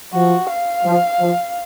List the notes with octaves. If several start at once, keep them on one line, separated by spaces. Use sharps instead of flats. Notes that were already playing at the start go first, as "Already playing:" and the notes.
F3 F#4
F5
F3
F3